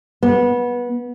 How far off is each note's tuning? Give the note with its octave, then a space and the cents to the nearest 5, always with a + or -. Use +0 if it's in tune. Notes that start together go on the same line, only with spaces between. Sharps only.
B3 -20